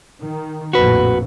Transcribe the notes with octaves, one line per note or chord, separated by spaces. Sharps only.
D#3
A#1 F2 A2 F#4 B4